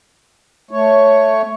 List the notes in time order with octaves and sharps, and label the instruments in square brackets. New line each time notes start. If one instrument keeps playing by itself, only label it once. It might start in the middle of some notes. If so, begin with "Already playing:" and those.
[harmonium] A3 C#5